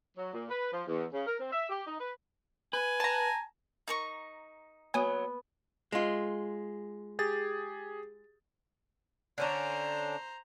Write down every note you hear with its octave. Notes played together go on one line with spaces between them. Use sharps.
F#3
A#2
B4
F3
E2
C#3
A#4
C4
E5
G4
D#4
B4
B4 G#5
A5 A#5
D#4 A#4 C#6
F#3 B3 G#5 D#6
G#3 F4
G4 G#4 A6
D3 C#4 D4 C5 A#5